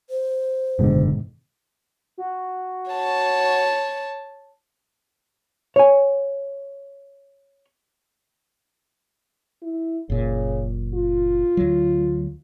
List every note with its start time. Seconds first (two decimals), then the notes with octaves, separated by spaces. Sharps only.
0.10 C5
0.79 F#1 G#2 B2 D3 D#3
2.18 F#4
2.91 C#5 A5
5.76 C#5 G#5
9.62 E4
10.10 F#1 A#2 C#3
10.94 F4
11.57 D2 F#3